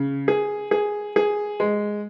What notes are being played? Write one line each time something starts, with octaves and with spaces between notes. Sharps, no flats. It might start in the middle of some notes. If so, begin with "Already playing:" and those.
Already playing: C#3
G#4
G#4
G#4
G#3